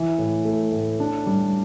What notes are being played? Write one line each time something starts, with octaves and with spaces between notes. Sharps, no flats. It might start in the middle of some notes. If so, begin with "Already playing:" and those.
Already playing: E3
A2
A3
A2
D4
G3